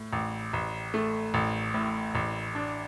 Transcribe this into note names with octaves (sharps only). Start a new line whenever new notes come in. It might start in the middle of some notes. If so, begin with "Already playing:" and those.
Already playing: A2
A1
A1
A3
A1
A2
A1
D4